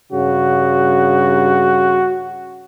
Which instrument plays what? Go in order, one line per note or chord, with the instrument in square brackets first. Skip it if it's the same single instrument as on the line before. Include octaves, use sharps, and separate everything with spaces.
[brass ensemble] G2 C#3 [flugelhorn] F#4